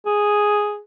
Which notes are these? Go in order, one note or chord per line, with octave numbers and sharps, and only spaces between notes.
G#4